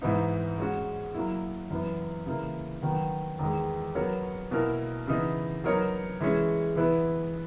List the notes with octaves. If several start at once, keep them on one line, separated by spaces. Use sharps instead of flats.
G#2 E3 B3 D#4
G#3 C#4 F#4
F#3 A#3 E4
F#2 E3 B3
C#3 E3 A#3
D#3 F#3 B3 F#4
E2 D#3 G#3
F#3 B3 F#4 A#4 C#5
B2 A#3 E4 A#4
C#3 E3 B3 D#4
F#3 B3 D#4 A#4 C#5
E3 G#3 C#4
E3 B3 E4 B4